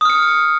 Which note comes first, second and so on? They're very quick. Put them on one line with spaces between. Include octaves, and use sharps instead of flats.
D#6 F6 C#7